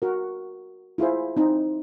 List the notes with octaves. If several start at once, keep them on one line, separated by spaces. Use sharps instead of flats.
F#4 A#4
E4 F4 G#4 C5
C4 D#4